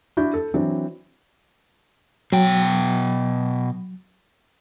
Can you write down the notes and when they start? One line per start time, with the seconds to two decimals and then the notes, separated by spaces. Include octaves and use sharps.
0.17 D4 E4 F#4 G6
0.34 A4
0.54 E3 F#3 C4 D4
2.32 B2 F#3 G5